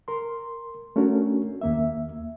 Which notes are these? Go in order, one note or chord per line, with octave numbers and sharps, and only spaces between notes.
A#4 C6
A3 C#4 D4 F#4 A#4
D#2 A#3 E5